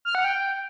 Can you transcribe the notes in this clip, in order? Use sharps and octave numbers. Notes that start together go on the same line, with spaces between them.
F6
F#5
G5